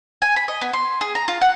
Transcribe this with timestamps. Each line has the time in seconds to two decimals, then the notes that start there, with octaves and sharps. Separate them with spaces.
0.22 G#5
0.36 B5
0.48 D#5
0.61 B3
0.73 C6
1.01 G#4
1.15 A#5
1.28 F4
1.41 F#5